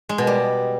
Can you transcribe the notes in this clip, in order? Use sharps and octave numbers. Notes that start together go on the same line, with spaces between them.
G#3
B2
G3